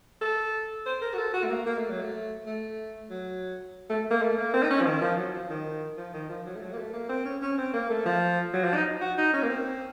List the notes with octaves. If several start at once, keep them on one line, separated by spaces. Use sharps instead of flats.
A4
C5
A#4
F#4
A4
F#4
A3
A#3
A#3
A3
F#3
A3
A3
F#3
A3
A#3
A3
A#3
C4
D#4
C#4
F3
D#3
F3
F#3
F3
D#3
F3
D#3
F3
F#3
A3
F#3
A#3
A3
A#3
C4
C#4
C#4
C4
A#3
A3
F3
F#3
F3
D#4
F#4
D#4
C#4
A#3
C4